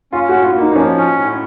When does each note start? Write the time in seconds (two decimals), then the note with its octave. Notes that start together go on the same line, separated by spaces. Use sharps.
0.12 C#4 F4
0.29 F#4
0.33 A2
0.44 F4
0.56 A#3
0.61 D#4
0.72 D#4
0.76 F3 C#4
0.97 C#4
1.19 A2